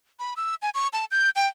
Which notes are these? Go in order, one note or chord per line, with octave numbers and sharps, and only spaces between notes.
B5
E6
G#5
C#6
A5
G6
G5